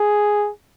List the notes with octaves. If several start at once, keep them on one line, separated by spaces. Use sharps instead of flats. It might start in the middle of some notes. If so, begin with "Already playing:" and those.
Already playing: G#4